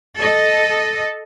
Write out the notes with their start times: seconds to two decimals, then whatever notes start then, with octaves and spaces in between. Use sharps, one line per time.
0.20 A4 D#5